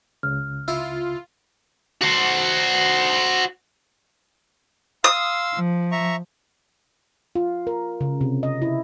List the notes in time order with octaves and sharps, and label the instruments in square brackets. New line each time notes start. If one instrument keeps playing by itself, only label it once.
[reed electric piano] C#2 C#3 [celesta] F6
[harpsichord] E4 [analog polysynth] F4
[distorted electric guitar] F#4 C5
[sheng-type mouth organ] F5 C6 E6 [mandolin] D#6
[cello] F3
[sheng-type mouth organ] E5 A#5 C#6
[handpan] F4
A#4
C#3
C3
D#5
E4